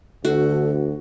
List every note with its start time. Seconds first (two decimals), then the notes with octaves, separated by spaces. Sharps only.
0.25 D2 D3 F#4 A4